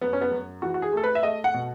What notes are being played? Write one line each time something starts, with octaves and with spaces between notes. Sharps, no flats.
F#2 B3
C#4
B3
F#2
E3 F#4
F#4
G#4
A3 A4
B4
E5
A3 D#5
F#5
B2